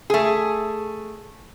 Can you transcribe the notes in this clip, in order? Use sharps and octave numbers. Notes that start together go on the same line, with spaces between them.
A3 G#4